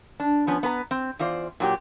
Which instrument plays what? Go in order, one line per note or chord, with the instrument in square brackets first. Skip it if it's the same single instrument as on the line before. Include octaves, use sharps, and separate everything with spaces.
[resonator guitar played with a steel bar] D4
F3 B3 C#4
B3 B4 A#5
C4
E2 F4 C5 D5
A#2 F#3 G4